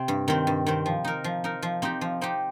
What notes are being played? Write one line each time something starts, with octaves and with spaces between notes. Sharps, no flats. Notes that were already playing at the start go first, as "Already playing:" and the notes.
Already playing: C3 C4
G2
D#3 C4
G2
D#3 C4
F3
D#4 A#4
F3
D#4 A#4
F3
C4 D#4 G4
F3
C4 D#4 G4